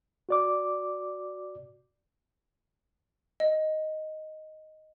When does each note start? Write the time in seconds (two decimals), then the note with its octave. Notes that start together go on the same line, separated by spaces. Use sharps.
0.29 F#4 D5 D6
3.40 D#5